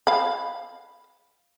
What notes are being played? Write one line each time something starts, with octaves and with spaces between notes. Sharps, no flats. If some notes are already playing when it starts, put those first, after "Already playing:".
F5 B5